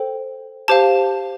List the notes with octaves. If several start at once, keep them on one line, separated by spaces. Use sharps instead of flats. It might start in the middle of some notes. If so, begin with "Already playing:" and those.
Already playing: A4 C5 G5
G4 C5 F5 A5